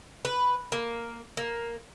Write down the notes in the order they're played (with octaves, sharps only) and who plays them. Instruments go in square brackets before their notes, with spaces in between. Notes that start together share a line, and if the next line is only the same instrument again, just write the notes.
[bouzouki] B4
A#3
A#3